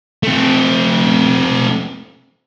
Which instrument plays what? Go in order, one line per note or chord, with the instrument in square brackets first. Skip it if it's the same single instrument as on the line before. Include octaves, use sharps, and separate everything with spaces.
[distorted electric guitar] A3 C4